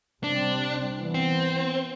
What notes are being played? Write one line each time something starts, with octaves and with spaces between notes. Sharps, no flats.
C3 G3 C4 D4
E3 B3
C4